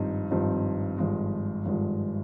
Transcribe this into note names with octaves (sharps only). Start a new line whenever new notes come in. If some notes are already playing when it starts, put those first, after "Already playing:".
Already playing: G#1 G2 F3 C4 D#4
G#1 G2 F3 C4 D#4
G#1 G2 F3 G#3
G#1 G2 F3 G#3